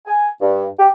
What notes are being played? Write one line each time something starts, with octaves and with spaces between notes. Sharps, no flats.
G#5
G2
G4